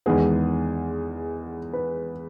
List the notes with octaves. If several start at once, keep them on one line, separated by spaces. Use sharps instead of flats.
E2 D#3 G#3 B3 G#4
B4